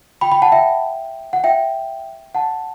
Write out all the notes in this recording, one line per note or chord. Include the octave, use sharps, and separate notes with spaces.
G5 B5
G5 B5
F#5 A5
E5 G5
F#5
E5 G5
F#5 A5